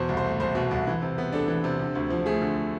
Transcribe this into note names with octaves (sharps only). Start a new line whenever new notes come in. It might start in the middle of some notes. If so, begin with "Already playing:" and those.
Already playing: E2 B2 C5
C2
C5
A3
C2 C5
B2
C2
E3
C3
B3
D4 A4
E3
C3
D3
D2
F3
A3 G#4
D3